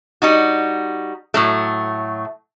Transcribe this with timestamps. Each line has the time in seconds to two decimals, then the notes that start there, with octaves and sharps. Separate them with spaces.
0.22 G3 D#4 F#4
1.34 A2 F#3 A3